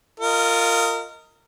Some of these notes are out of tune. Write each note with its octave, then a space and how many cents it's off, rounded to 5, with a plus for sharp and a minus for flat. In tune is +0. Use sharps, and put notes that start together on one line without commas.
F4 +0 A#4 -25 D#5 +15